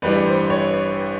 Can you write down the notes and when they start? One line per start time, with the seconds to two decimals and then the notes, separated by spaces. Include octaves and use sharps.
0.02 A1 G2 E3 G3 B4
0.26 C5
0.50 C#5